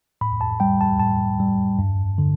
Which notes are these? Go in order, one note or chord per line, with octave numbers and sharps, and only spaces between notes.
A2 B5
A5
G3 G5
A5
A2 A5
G3
G2
D3